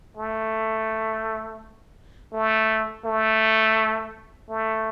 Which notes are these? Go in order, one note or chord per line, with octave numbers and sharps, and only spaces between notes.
A3
A3
A3
A3